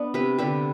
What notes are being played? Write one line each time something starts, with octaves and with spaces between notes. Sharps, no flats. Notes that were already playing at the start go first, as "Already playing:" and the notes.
Already playing: B3 D4
C3 G4 B4
D3 G4 B4